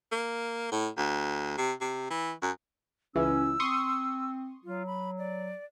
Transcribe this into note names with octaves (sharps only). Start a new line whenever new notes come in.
A#3
A2
D2
C3
C3
E3
F#2
C#2 E3 C#4 E6
C4 C6 C#6 D#6
F#3 F4
B5
D5